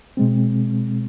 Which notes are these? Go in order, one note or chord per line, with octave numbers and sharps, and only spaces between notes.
B2 G#3 C4